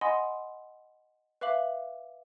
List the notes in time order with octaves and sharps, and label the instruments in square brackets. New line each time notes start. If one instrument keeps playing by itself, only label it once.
[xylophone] D#5 F#5 G#5 B5 C6 D#6
B4 E5 F5 D6 F#7